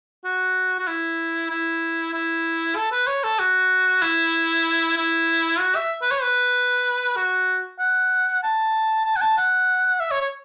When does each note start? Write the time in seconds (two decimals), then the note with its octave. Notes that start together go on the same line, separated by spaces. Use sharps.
0.24 F#4
0.79 F#4
0.87 E4
1.50 E4
2.14 E4
2.76 A4
2.92 B4
3.07 C#5
3.24 A4
3.39 F#4
4.02 E4
4.97 E4
5.59 F#4
5.76 E5
6.02 B4
6.11 C#5
6.22 B4
7.16 F#4
7.79 F#5
8.43 A5
9.06 A5
9.16 F#5
9.21 A5
9.38 F#5
10.00 E5
10.11 C#5
10.21 C#5